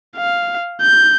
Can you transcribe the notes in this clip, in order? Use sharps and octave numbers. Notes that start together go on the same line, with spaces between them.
F5
G6